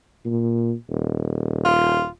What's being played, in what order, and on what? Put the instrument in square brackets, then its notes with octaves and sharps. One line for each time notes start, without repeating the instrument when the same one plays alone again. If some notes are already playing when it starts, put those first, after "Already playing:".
[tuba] A#2
D#1
[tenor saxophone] F4